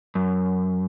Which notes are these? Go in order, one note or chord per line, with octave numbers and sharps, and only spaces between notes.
F#2